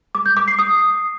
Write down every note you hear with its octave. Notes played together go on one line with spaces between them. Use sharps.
D6
G6
D6
C7
D#6